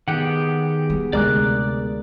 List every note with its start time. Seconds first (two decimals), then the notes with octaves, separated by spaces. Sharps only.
0.08 D#3 B3 G4 G#4 F#5
0.90 G3
1.13 D2 C3 G#3 A#4 D5 D6 F#6